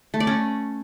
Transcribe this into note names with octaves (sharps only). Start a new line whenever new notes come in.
A3
D5
C#4